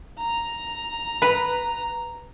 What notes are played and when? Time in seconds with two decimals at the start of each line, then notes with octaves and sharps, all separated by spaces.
0.19 A#5
1.22 B4